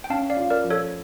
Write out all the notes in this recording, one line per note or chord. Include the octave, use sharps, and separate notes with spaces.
G5
C#4 F5 A5
D5 F5
F4
A#4 D5
F3
A4 C#5